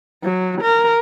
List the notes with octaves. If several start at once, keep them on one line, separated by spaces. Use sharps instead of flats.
F#3
A#4